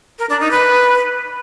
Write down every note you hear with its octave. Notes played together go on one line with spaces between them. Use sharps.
A#4
D4
D#4
B4